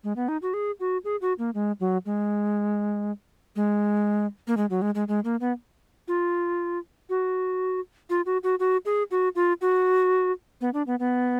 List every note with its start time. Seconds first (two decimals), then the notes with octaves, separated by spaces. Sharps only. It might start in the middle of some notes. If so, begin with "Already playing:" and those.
0.04 G#3
0.16 B3
0.28 D#4
0.42 F#4
0.54 G#4
0.80 F#4
1.04 G#4
1.21 F#4
1.39 A#3
1.54 G#3
1.80 F#3
2.06 G#3
3.56 G#3
4.47 A#3
4.57 G#3
4.70 F#3
4.82 G#3
4.95 G#3
5.08 G#3
5.24 A#3
5.41 B3
6.08 F4
7.10 F#4
8.10 F4
8.26 F#4
8.43 F#4
8.60 F#4
8.86 G#4
9.11 F#4
9.36 F4
9.61 F#4
10.61 B3
10.74 D4
10.87 B3
10.99 B3